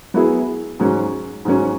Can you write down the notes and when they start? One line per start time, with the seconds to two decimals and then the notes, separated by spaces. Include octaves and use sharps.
0.14 F#3 B3 E4 G#4
0.79 G#2 F#3 C#4
1.45 G#2 F#3 C#4